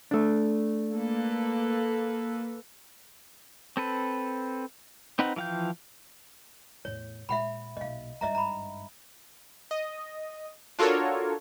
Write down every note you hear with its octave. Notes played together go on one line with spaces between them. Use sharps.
A3 D4
A#3 A4 B4
C4 A4 B4
C4 D#4 B4 F#5
E3 F3 F5 G5 G6
E2 A2 C#5
A#2 G#3 E5 F#5 B5
B1 A#2 D#5 F5
G#1 G2 D#5 E5 A#5
A#5 B5
D#5
D4 F4 F#4 A4 A#4 C#5